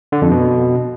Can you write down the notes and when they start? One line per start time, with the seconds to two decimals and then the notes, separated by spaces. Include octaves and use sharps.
0.12 D3
0.22 F2
0.31 B2